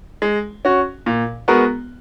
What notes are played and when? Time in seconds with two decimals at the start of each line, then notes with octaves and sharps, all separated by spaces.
0.22 G#3
0.65 C#4 F#4
1.06 A#2
1.48 G#3 B3 F#4 A#4